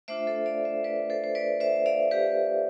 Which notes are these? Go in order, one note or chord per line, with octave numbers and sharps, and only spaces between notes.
A3 D4 F4 C5 E5
A4 C5
D5 F5
C5 E5
B4 D5
A4 C5
C5
B4 D5
C5 E5
D5 F5
G4 B4